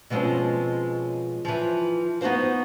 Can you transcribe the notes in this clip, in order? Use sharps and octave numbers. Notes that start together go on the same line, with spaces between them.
B2 F3 G#3 C4 C#4
E3 F3
B3 D#4 F#4 C5 F5